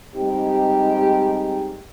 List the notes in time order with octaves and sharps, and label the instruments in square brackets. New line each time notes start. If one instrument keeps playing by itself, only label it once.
[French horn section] G3 G#3 C4 D#4 G4